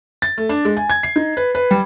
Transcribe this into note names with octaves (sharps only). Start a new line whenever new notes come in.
A6
A3
D4
G#3
G#5
G#6
C7
D#4
B4
B4
G3